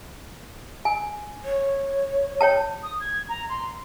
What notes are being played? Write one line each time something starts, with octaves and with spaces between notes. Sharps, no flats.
G#5
C#5
C#5 G5 A5
D#6
G#6
A#5
C6